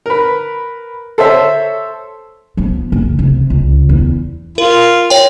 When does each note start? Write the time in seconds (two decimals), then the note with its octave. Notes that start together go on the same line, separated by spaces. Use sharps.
0.06 A#4 B4
1.18 A4 C5 C#5 E5
2.57 F3 B3
2.92 F#1
3.19 C3
3.50 C#2
3.89 E2 E3
4.58 F4 A#4
5.10 C#5 G5